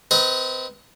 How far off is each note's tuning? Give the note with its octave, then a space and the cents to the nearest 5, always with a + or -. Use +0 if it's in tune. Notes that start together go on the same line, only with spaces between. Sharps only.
C4 -20 B4 -25 D#5 +20